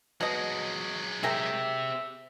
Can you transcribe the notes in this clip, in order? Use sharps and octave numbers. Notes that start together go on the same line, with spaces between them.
B2 F#3 G#3 D#5
C4 G4 G#4 A#4 E5 G5